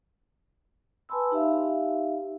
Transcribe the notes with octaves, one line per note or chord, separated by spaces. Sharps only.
B4 G#5 A5 B5 C6 E6
D#4 G4 E5 F5